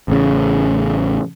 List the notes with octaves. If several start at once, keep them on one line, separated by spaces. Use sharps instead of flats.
A1 C#3